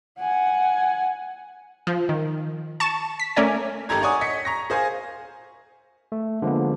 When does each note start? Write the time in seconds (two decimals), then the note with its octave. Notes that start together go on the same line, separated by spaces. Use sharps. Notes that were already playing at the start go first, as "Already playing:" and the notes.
0.19 F#5 G#5
1.87 F3
2.09 D#3
2.80 A5 C#6 E7
3.20 B6
3.36 A3 C#4 A#4 D5 G#5
3.89 G#1 D#4 G4 A4 A#5 G#6
4.02 C#5 D5 F#5 G#5 C#6 D#6
4.21 D#5 B6 C#7
4.45 A#5 C#6 A#6
4.70 G#4 C5 F5 G#5
6.12 A3
6.42 D3 F3 G#3 A#3 B3